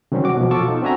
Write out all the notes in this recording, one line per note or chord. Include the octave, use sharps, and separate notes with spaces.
C3 D#3 F#3 G3 C4 C#4
F#4 D6
B2 F3
F4 A4 A5 C#6 D6 E6
D#4
C4 D4 F#4 E5 G#5 A#5